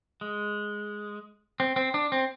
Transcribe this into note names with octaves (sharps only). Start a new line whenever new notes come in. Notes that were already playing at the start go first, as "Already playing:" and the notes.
G#3
C4
C4
D4
C4